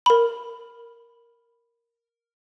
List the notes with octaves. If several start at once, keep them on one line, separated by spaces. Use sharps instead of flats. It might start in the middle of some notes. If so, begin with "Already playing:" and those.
A#4 B5